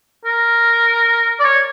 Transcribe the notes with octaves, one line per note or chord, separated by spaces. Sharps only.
A#4
D5
C#5